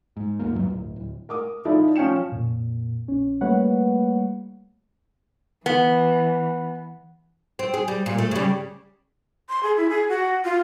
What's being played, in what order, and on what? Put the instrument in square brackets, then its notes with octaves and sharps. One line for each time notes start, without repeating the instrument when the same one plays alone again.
[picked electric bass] G#2
D#1 A#3
D1 G2 F#3
D1
D1
[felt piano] A#4 D6 D#6
F3 D#4 E4 A4 D5
F3 C#4 G5 C#7 E7
[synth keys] F2 A#2
A#1 C#4
G3 A3 A#3 B4 C#5 F#5
[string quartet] E3 [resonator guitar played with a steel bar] B3
[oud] C4
G#4
G3
A#2
A3
C#3 G3
[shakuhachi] C6
G#4
E4
G#4
F#4
F4